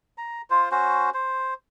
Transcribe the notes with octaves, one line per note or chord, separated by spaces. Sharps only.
A#5
F4 C5
C#4 F#4 C5
C5